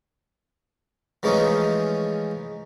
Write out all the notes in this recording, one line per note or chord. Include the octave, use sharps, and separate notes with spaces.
E3 F3 G#3 A3 C#4 D#4